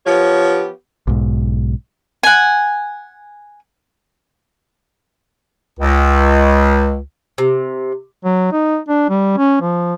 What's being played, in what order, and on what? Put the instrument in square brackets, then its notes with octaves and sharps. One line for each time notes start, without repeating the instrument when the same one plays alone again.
[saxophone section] F3 B3 G4 C#5
[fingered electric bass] B1 G#2
[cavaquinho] F#5 G#5
[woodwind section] C#2
[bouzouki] C3
[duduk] F#3
D#4
D4
G3
C#4
F3